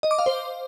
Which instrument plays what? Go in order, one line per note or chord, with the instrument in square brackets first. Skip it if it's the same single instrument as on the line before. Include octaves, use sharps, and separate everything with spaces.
[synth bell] D#5
D6
F5
C5